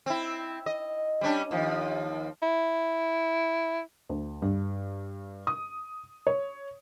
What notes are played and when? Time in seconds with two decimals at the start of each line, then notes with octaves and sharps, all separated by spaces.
0.06 C4 E4
0.66 D#5
1.21 G3 C#4 D4
1.51 D#2 F3
2.42 E4
4.09 D2
4.42 G2
5.47 D#6
6.27 C#5